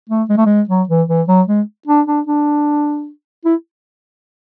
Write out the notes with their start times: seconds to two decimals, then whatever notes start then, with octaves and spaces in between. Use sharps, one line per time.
0.09 A3
0.29 G#3
0.37 A3
0.46 G#3
0.69 F#3
0.89 E3
1.08 E3
1.28 F#3
1.47 G#3
1.87 D4
2.07 D4
2.27 D4
3.45 E4